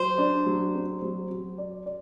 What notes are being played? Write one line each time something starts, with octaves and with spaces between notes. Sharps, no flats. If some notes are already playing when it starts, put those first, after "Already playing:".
Already playing: F#3 C5
D4
F#3
C4
F#3
F#3
D5
D5